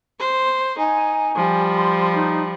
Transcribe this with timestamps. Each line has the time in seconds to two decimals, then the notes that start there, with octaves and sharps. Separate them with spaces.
0.19 C5
0.78 D#4 G#5
1.36 F3 G3
1.75 C6
2.15 D#4